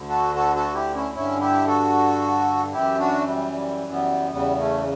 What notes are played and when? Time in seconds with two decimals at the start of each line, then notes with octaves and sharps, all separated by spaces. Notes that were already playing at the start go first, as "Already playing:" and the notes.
Already playing: D2 D3
0.09 F#4 A4
0.35 F#4 A4
0.55 F#4 A4
0.74 E4 G4
0.94 C#4 E4
1.14 G2 D3 C#4 E4
1.41 E4 G4
1.67 F#4 A4
2.73 F#2 E3 E4 G4
2.99 D4 F#4
3.26 G3
3.52 G3
3.91 G3 B3
4.31 E2 C#3 E3 G3 B3
4.58 A3 C#4